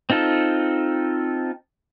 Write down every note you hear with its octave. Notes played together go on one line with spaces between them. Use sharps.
C4 D#4 F4 A4